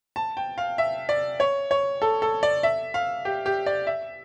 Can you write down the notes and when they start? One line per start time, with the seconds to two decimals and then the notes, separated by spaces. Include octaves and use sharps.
0.16 A5
0.37 G5
0.58 F5
0.78 E5
1.09 D5
1.40 C#5
1.71 C#5
2.02 A4
2.22 A4
2.43 D5
2.63 E5
2.94 F5
3.25 G4
3.46 G4
3.66 D5
3.87 E5